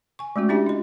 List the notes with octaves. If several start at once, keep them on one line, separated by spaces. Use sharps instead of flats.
G#5 C#6
G#3 A3 C#4 F#4
C#4 D4 E4 G4 E5 A5
F4 D#5